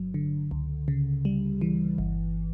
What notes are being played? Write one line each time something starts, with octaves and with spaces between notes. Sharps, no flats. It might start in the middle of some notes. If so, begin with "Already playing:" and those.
Already playing: G1 G2 F#3
D3
C#2
C#3
G3
E3
G1